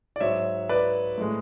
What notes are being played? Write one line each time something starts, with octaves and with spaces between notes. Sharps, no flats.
D5
G#2 F#3 C#5 E5
B4 D5
A2 G#3